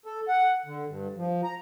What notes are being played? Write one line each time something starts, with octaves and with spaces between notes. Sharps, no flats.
A4
F#5
D3
G2
F3
A#5